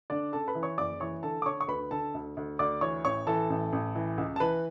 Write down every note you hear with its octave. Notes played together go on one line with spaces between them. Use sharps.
D3 D4 D5
C#3 A4 A5
B4 B5
E3
C#5 C#6
F#1 D5 D6
E3 C#5 C#6
D3 A4 A5
D6
D3 C#5 C#6
C#6
D2 B4 B5
D3 A4 A5
D2
D2
D2 D5 D6
E3 C#5 C#6
A1 C#5 C#6
E3 A4 A5
A1
A1
E3
C#2
A5
E3 B4 B5